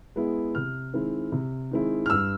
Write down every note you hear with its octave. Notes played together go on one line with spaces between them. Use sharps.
G#3 B3 E4
C3 F6
D#3 G#3 C4 E4
C3
D#3 G#3 C4 E4
F6
G2 E6